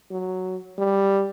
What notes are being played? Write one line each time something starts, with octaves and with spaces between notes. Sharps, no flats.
F#3
G3